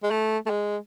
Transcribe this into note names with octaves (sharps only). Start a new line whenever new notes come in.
G#3
A3
A3
G#3